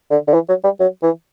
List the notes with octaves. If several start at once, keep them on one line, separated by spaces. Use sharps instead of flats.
D3
D3
E3
F#3
G3
F#3
E3